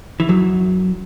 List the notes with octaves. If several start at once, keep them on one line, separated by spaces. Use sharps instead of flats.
E3
F#2 F#3